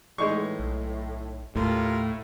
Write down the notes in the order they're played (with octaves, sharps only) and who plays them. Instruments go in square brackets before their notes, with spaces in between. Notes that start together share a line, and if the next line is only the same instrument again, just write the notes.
[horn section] A2 [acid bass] E3 [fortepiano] G#3 D#4 C#6
[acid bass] B1
[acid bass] D#2 [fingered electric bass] A2 [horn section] F4 G4 A#4